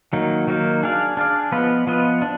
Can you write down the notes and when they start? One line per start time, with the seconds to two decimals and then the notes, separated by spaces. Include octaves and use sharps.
0.13 D#3 F#3 A#3 D#4
0.47 D#3 F#3 A#3 D#4
0.83 D4 G#4 D5 F5
1.17 D4 G#4 D5 F5
1.52 F3 B3 F4 B4 D#5
1.87 F3 B3 F4 B4 D#5
2.22 D4